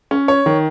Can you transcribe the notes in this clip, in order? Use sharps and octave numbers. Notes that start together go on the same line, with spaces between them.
C#4
C#5
D#3